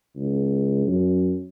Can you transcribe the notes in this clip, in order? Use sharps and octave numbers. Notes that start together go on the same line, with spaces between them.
C#2
F#2